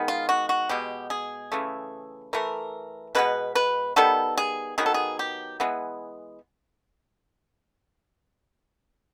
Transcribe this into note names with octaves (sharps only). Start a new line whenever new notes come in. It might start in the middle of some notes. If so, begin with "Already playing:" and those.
Already playing: D#3 G#3 B3
F4
F#4
F#4
B2 G#3 B3 G4
G#4
C#3 E3 A3
E3 A3 A#4
B2 G#3 B3 B4
B4
D#3 G3 B3 A4
G#4
D#3 F#3 B3 G#4
A4
G#4
G4
E3 G#3 B3